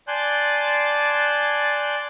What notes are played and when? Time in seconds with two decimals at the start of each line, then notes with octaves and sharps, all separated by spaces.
0.08 D5 G#5 A5 C6 F#6 G6